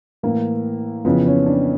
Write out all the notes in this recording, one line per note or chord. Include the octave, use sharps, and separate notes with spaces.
A2 E3 A#3
F2 C#3 E3 B3
C#4
D4